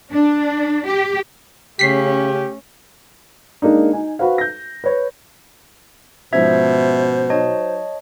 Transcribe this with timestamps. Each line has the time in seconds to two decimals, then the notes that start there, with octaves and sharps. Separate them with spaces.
0.12 D4
0.88 G4
1.79 C#3 A3 C#4 G4 B6 C7
3.62 G#3 A#3 D4 D#4
3.92 D#4 G#5
4.19 F#4 B4 C5 F5
4.38 G6 A#6
4.84 B4 C#5
6.33 G#2 B2 F3 C#4 C5 E5 G#6
7.30 F#3 D#4 F#4 C#5 D#5 A5